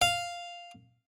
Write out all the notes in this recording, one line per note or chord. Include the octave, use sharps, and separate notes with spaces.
F5